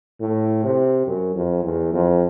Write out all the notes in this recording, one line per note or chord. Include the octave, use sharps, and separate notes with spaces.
A2
C3
F#2
F2
E2
F2